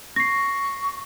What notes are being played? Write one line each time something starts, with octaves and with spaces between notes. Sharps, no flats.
C#6 A#6 C7